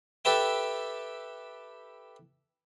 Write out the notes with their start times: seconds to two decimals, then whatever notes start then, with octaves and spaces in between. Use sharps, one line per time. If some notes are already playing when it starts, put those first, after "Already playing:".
0.25 G4 A4 B4 E5 G5